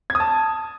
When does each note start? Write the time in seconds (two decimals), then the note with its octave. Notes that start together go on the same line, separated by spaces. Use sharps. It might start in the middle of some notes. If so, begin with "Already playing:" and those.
0.10 G#6
0.15 D#6
0.20 A5